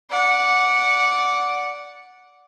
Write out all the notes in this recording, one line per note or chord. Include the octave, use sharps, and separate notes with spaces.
D5 F#5